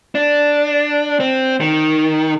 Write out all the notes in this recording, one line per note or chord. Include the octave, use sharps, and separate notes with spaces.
D4
C4
D#3